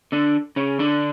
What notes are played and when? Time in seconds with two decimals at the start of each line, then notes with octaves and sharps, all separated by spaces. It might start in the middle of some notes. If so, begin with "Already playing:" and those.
0.12 D3 D4
0.56 C#3 C#4
0.79 D3 D4